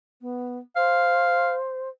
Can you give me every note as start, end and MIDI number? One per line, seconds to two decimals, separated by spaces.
0.21 0.58 59
0.76 1.89 72
0.76 1.55 77